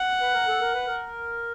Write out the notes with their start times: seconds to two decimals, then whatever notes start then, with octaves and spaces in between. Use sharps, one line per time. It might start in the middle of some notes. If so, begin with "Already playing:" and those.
Already playing: F#5
0.21 B4
0.34 A#4
0.48 A4
0.61 A#4
0.74 B4
0.87 A#4